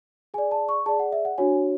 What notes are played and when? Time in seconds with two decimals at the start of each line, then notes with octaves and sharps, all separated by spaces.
0.34 G#4 D5 G#5
0.51 A5
0.69 C#6
0.86 G#4 D5 A5
0.99 F#5
1.12 E5
1.25 F#5
1.38 D4 F#4 C#5 G#5